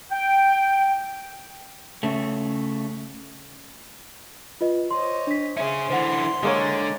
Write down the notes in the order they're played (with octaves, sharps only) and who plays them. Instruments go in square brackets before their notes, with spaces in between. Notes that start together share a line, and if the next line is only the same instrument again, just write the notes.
[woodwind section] G5
[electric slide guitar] C#3 A3
[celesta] F4 B4 D#5
[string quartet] C5 C#5 D#5 [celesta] C6
[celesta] D4 B6
[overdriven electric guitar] C#4 G#4 [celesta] E5 [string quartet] C6
[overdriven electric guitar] D3 E3 [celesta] C5 F#5
[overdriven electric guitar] D3 [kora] G#3 A#3 C#5